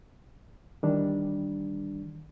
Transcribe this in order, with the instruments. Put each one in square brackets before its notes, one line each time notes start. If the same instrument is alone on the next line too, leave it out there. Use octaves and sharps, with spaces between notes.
[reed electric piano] D#3 E3 G3 D4